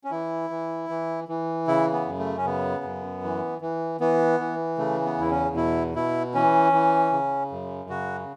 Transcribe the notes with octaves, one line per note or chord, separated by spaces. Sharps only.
C#4
E3 E4
E3
E3
E3
C#3 E4
B3
F#2
A3
C#4
C#3 B3
F#2
E3
E3
E3 B3
E3
C#3 A3
B3
E2 E4
C#4
B2 E4
B2 E4
E3 C#4
E3
C#3
F#2
C#3 F#4